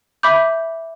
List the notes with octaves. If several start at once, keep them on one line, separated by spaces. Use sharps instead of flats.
E5 B5 D6 G6